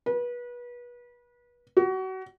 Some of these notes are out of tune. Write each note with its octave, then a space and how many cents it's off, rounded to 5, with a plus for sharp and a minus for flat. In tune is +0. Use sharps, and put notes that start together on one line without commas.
B4 -30
F#4 +30